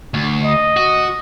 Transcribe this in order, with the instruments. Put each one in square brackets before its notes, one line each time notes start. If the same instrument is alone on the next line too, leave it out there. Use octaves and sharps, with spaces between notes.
[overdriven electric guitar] D2
[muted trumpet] D#5
[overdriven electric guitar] F#4